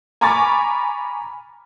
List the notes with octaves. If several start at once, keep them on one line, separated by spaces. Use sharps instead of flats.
G#5 A#5 B5 C#6 D6 A6